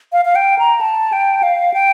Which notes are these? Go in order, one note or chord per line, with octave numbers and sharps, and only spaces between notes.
F5
F5
G5
A#5
A5
G5
F5
G5